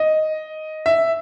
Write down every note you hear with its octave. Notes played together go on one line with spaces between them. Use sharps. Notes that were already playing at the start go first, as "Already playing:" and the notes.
Already playing: D#5
E5